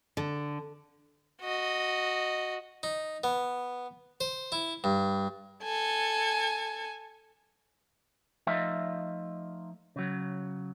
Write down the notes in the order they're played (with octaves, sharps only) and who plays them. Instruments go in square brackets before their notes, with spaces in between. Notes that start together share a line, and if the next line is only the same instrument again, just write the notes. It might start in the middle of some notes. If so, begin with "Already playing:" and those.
[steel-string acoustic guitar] D3
[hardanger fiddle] F#4 D#5
[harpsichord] D#4
B3
C5
E4
G2
[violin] A4 G#5
[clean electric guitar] F3 A3 D#4 F4 D#5 E5
C#3 F#3